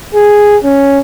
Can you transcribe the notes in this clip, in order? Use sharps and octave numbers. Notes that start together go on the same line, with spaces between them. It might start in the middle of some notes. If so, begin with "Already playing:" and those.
G#4
C#4